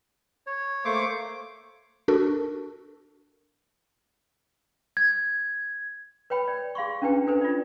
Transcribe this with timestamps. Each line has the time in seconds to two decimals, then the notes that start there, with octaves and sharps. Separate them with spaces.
0.47 C#5
0.85 A3 A#3 C5 C#6 D6
2.08 D4 F#4 A4 A#4 C#6
4.97 G#6
6.30 B4 C#5 G5 B5
6.48 D5
6.75 G#4 F5 C6 C#6
7.02 C#4 D4 E4 B4 G5
7.27 D4 A4 B4 C5
7.41 F4 D5